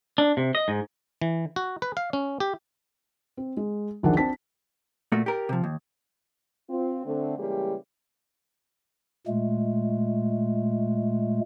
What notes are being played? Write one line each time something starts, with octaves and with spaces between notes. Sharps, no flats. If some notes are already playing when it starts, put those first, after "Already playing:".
D4
C3
D#5
G#2
E3
F#4
B4
F5
C#4
G4
C4
G#3
A#1 D#2 D4 G#4 A#4 F#5
C4 D4 A5 B6
A#2 A3 F#4
G4 A#4
C3 F3
D#2
C4 F4
D3 A3 C4
C#3 E3 G3 G#3 A#3 G4
A#2 G#3 A3